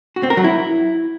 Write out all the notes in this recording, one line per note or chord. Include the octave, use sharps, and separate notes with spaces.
F#4
C4
A#4
F#3
E4